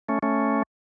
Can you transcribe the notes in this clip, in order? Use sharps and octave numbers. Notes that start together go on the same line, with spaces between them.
A3 C#4
A3 C#4